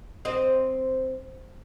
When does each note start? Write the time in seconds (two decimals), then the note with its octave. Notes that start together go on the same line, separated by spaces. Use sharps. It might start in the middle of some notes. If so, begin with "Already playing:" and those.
0.25 C4 D#5